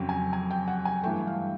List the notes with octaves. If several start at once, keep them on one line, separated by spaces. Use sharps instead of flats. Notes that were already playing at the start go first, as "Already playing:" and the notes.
Already playing: F2 C#3 F#3 G5
G#5
G#5
G5
F#5
G#5
G2 E3 A3 G5
F5